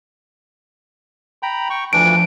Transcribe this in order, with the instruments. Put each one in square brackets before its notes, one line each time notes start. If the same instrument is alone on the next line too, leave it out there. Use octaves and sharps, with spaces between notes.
[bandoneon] G5 A#5 B5
G5 C#6
[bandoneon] D2 E3 D4 [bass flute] F3 [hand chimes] D7